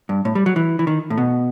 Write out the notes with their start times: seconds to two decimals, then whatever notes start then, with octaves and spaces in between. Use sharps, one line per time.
0.09 G2
0.25 A2
0.35 G3
0.46 F#3
0.56 E3
0.79 E3
0.87 D#3
1.10 A2
1.18 B2